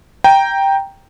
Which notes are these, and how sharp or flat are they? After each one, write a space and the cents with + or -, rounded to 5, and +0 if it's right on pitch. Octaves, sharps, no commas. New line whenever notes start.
G5 +0 A#5 +5